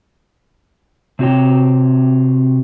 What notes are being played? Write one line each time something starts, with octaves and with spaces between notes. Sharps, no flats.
C3 C4 F#4 C#5 G5